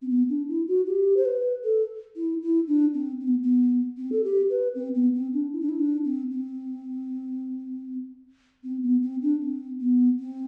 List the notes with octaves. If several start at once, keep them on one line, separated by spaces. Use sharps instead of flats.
C4
B3
D4
E4
F#4
G4
C5
B4
A4
E4
E4
D4
C4
C4
B3
B3
C4
A4
G4
B4
C4
B3
C4
D4
E4
D4
E4
D4
C4
C4
C4
B3
C4
D4
C4
B3
C4